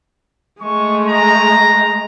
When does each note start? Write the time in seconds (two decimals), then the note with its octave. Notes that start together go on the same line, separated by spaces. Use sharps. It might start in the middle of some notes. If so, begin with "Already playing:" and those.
0.61 G#3 A3 C#6
1.09 A#5